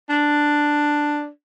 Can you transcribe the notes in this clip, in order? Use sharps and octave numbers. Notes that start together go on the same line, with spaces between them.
D4